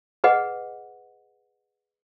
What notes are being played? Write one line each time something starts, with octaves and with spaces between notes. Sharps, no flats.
G#4 B4 D#5 F#5